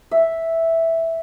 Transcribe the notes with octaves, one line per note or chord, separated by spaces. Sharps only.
E5